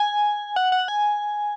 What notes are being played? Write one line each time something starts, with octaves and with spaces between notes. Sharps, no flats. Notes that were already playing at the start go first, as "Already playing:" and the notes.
Already playing: G#5
F#5
F#5
G#5